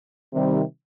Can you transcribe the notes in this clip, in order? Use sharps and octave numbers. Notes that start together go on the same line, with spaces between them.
C3 D#3 G3